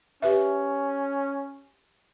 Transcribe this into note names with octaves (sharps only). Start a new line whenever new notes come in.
C#4 G4 B4 E5